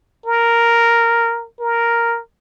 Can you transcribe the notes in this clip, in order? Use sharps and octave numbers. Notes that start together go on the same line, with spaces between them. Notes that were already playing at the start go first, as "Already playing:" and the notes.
A#4
A#4